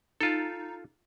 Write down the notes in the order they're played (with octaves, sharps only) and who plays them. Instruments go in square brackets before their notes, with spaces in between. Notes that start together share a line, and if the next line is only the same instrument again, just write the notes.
[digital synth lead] D#4 [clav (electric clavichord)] F4 A4